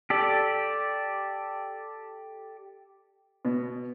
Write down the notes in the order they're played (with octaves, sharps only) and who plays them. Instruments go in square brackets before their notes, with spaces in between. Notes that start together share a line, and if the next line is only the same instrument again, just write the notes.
[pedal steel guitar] G4 A4 D5
[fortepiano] B2